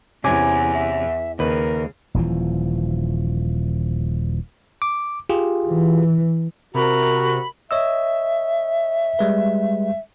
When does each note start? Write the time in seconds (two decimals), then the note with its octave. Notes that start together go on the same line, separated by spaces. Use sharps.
0.24 E2 C3 E3 C#4 G#5 D6 G#6
0.74 E5
1.39 D#2 C#3 A#4 B4
2.14 D#1 E3 F3
4.82 D6
5.29 F4 G4 G#4
5.68 E3
6.74 C3 F#4 A#4 B5
7.71 C#5 D#5 E5 E6
9.19 G3 G#3 B4